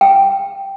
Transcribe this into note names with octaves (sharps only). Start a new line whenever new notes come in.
G5